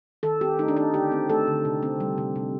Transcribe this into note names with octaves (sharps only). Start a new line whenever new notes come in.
D#3 A4
C4 G4
A3 D#4
D4
D#3 D#4
D3 G4
C4
A3 A4
D3
C3
C4
G3
C3
C3